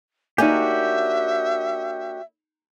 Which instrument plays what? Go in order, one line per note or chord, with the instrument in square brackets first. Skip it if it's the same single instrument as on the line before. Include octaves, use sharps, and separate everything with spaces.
[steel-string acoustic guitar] A#3 D4 C#5 [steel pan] D#4 G#5 [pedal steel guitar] F#4 G4 [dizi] E5